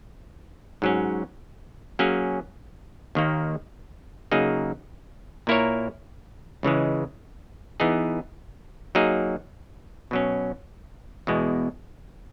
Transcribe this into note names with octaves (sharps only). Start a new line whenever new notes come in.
G#2 F#3 C#4
F#3 A#3 C#4 G#4
D#2 D#3 A#3
C#3 F#3 A#3 D#4 G#4
A#2 A#3 E4 A#4 C#5
C#2 C#3 E3 G#3
E3 B3 D#4 G#4
F#3 A#3 D#4 G#4
B2 F#3 C#4
E2 B2 G#3